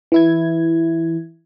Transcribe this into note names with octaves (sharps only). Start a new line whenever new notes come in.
E3 E4 G#6